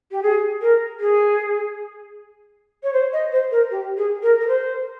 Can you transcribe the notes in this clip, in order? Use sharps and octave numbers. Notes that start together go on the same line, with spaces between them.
G4
G#4
A#4
G#4
C#5
C5
D#5
C5
A#4
G4
G#4
A#4
A#4
C5